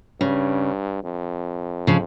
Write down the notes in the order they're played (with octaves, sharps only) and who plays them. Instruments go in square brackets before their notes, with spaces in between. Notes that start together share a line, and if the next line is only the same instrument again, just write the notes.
[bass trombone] G2 [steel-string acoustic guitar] C#3
[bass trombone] F2
[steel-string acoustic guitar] C#3 F3